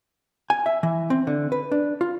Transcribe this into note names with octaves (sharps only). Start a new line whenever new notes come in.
G#5
E5
E3
C4
D3
B4
D4
F4